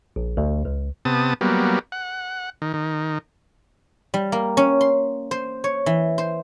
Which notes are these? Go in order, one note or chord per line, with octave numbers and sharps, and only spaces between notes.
A#1
D2
C#2
C3 B3 A5 D#6
F#3 G3 A#3 B3
F#5
D#3
D#3
G3
A#3
C#4
C6
C5
C#5
E3
C5